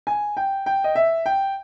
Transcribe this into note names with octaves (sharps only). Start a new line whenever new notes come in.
G#5
G5
G5
D#5
E5
G5